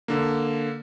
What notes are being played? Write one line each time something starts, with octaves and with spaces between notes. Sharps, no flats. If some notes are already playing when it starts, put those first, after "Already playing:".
D3 A#3